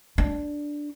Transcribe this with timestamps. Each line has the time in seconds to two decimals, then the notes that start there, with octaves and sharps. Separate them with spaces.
0.18 D4